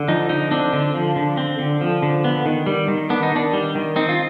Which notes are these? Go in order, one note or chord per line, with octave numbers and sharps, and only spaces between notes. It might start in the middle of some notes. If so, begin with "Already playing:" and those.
Already playing: D3
F3 D#4
D3 D#4
C4 D4
D3
F3
D3
C4
D3
F3
D3
B3
D#3
G3
D#3
B3 D4
D#4
D#3 D4
G3
D#3
C4 D#4
F4